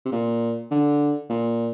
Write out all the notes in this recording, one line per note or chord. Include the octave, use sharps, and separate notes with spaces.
C3
A#2
D3
A#2